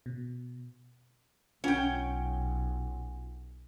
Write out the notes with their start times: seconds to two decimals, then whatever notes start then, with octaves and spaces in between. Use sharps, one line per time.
0.06 B2
1.64 B1 C#4 F4 F#5 G5